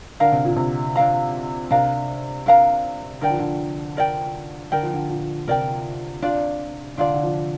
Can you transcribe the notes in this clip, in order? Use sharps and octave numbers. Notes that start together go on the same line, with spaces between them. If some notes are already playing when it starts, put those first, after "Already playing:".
D3 D4 A#4 F5 A#5
C3
A#2
C3
D4 A#4 F5 A#5
C3 D4 A#4 F5 A#5
D4 A#4 F5 A#5
D3 A#4 D5 G5
F3
D3
A#4 D5 G5
D3 A#4 D5 G5
F3
D3
A#2
C3 A#4 D5 G5
D4 F4 D5
D3 D4 F4 D5
D3
F3